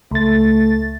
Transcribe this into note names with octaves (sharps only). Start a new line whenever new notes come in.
C#2 A3 A6